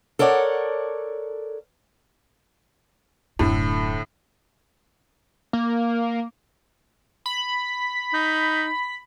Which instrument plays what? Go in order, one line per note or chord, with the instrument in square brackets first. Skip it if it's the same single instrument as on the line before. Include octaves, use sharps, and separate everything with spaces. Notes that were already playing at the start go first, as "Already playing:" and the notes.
[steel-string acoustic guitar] A4 A#4 C#5 D5 F#5
[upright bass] D1 F#2 [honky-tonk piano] A2 D3
[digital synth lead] A#3
[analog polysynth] B5
[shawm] D#4